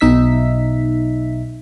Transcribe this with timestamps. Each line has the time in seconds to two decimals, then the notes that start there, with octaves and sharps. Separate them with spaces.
0.01 B1 D#4 E5 B6